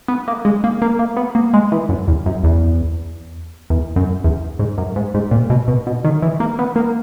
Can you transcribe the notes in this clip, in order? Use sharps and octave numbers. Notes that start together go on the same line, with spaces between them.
B3
A#3
G#3
A#3
A#3
A#3
B3
A#3
G#3
E3
F#2
E2
F#2
E2
E2
F#2
E2
G#2
F#2
G#2
G#2
A#2
B2
B2
B2
D#3
E3
A#3
B3
A#3